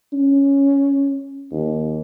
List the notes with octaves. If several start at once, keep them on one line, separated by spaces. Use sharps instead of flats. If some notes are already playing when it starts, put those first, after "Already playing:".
C#4
D#2